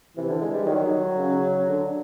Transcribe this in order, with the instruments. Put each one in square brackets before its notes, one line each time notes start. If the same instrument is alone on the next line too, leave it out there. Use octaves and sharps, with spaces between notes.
[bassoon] C3 [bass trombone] E3
[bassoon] D3
G#3
G3
[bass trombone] D#3 [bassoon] F#3
[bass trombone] C#3
D3